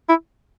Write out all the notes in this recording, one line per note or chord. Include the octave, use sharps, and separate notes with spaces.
E4